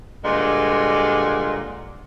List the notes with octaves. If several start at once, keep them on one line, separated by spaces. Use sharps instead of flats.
G2 A#2 D3 G#3